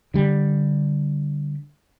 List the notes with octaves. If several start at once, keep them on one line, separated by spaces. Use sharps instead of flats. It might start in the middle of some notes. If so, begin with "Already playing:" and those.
D3 G3